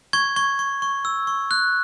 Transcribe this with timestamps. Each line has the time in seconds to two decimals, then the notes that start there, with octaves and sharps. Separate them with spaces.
0.13 C#6 G#6
0.36 C#6 G#6
0.59 C#6
0.82 C#6
1.05 E6
1.27 C#6
1.51 F#6